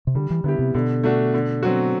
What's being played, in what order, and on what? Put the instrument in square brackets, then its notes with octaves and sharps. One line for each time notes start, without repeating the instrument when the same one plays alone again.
[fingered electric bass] C3
[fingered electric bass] D3 [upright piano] G3
[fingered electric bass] E3
[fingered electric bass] D3 [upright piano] B3 E4 G4
[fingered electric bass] C3
[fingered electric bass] B2 [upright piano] D3
[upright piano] A3 D4 F#4
D3
F#3 C4 F#4